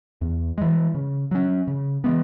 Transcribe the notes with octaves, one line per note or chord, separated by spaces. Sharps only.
E2
E3 G#3
C#3
F#3 C#4
C#3
E3 G#3 B3